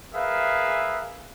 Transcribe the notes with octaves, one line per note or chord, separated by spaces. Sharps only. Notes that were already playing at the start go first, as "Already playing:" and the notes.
G#4 A#4 B4 E5 F5